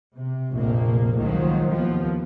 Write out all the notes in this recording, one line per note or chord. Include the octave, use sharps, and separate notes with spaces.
C3
F1 A#1 A#3
C#2 D#3 F3 F#3
D#2 F3 B3